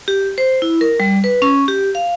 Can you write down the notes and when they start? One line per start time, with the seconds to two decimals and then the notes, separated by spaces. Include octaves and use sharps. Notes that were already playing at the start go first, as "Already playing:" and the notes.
0.08 G4
0.38 C5
0.62 E4
0.81 A#4
1.00 G3
1.24 B4
1.42 C#4
1.68 G4
1.95 F5